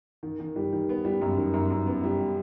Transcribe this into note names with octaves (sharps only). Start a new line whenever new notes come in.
D#3
D#3
G3
D#3
B3
G3
F#2
D#3
F#2
F#2
B3
G3